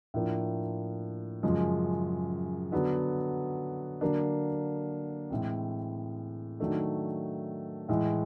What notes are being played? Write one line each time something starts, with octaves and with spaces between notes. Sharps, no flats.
A2 F3 A#3 D4
F#2 C#3 F3 G#3
D3 F#3 B3 D4
D3 F#3 A#3 D4
A2 E3 G#3 C4
D#3 F#3 A3 D4
A2 E3 G#3